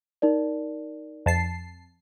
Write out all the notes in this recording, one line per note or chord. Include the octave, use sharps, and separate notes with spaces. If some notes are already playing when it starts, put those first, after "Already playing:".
D#4 A#4 D5
F2 A5 C7